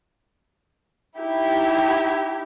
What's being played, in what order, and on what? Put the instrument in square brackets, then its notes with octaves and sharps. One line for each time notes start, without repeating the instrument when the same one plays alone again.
[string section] D#4 E4 G4